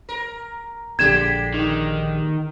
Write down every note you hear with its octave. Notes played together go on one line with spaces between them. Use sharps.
A#4
A#1 D3 G#3 G4 G#6 E7
D#3